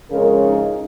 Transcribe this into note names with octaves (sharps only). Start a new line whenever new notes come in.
F2 C#3 G#3 C#4 A#4
D#4